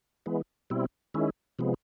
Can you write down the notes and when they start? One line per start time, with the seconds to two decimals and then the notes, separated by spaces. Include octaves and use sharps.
0.26 E3 G#3 B3
0.70 B2 G3 C4 E4
1.14 D#3 G#3 C#4 E4
1.59 C3 F3 G#3 B3